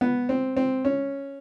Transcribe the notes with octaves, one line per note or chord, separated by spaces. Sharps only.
B3
C4
C4
C#4